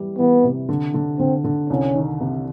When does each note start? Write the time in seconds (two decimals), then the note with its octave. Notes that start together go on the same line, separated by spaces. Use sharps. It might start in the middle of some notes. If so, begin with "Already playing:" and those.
Already playing: E3 G3
0.18 E3 B3
0.44 C3
0.69 D3
0.94 D3
1.19 D3 C4
1.44 D3
1.69 C2 C#4
1.94 D#3
2.20 C3